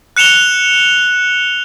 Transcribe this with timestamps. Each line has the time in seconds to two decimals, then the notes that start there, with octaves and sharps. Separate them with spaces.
0.17 F#6 C#7 E7 F7 G7